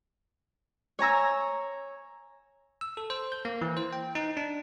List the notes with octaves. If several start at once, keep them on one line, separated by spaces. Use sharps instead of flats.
C#5 G#5 A#5 E6
E6
A4
C5
G6
A#3
E3
C5
G5
D#4
D4